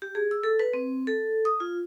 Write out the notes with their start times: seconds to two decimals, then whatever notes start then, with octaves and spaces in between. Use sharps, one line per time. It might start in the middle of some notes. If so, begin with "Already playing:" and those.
0.02 G4
0.15 G#4
0.31 E6
0.43 A4
0.59 B4
0.73 C4
1.07 A4
1.45 D#6
1.60 F4